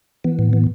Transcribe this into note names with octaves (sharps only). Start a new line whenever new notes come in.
E3 B3
A2
E3